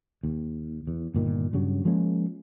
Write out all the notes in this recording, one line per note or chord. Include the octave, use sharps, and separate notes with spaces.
D#2
E2
G1 A#2 D#3
G2 C#3 F#3
F3 G#3 A#3 C#4